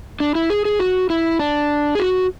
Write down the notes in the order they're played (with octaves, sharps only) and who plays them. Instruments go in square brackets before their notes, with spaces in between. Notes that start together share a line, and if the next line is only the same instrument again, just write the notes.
[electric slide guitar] D4
E4
G#4
G#4
F#4
E4
D4
G#4
F#4